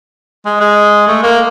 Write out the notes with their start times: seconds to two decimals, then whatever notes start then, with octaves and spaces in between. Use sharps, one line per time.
0.45 G#3
0.61 G#3
1.08 A3
1.23 A#3